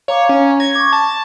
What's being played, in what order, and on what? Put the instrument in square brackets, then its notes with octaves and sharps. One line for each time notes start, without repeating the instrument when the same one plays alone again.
[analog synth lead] C#5 [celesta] F5 A#5 D6
[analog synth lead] C#4
[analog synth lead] G#6 [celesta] A#6
[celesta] C#6 D6
[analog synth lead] A5